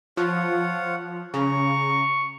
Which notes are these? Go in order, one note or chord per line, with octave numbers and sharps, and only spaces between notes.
F3 F4 C#5 F#5
C#3 A#5 C#6